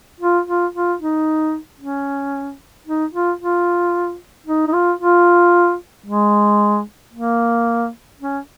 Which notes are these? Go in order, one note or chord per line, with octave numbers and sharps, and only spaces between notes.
F4
F4
F4
D#4
C#4
D#4
F4
F4
D#4
D#4
F4
F4
G#3
A#3
C#4